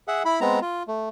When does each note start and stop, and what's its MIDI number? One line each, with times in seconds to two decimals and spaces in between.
0.08 0.23 68
0.08 0.23 76
0.08 0.23 78
0.25 0.40 64
0.25 0.40 83
0.41 0.60 56
0.41 0.60 59
0.41 0.60 60
0.41 0.60 82
0.62 0.83 65
0.88 1.09 57